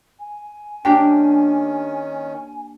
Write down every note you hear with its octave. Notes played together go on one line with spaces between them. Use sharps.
G#5
D#3 A#3 C#4 D4 G4 G5